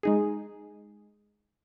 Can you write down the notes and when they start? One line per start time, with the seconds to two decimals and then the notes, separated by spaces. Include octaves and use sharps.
0.03 G#3 D#4 G#4